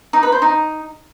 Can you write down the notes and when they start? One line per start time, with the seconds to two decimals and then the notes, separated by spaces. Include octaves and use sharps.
0.13 D#4
0.23 B4
0.32 C5
0.42 D#4